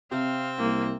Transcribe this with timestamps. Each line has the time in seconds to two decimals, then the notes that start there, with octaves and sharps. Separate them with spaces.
0.11 C3 C4 F5
0.58 C2 A#3